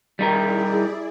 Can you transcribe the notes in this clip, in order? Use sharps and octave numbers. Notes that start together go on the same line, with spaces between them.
G3 D#4 E4 G#4 A#4 D5